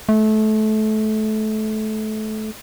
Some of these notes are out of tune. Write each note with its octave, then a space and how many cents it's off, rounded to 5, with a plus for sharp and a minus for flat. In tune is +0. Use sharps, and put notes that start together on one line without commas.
A3 -25